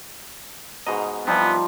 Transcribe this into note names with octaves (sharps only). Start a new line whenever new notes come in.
G#2 B2 D#5 A#5
E3 F3 G3 B3 C4 D#4